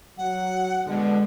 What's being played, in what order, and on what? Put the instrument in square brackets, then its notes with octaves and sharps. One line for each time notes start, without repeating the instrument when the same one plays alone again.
[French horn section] F#3 [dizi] F#5
[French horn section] B2 D3 [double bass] G#3